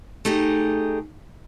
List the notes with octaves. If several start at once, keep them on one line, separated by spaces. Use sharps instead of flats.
A3 D#4 G4 G#4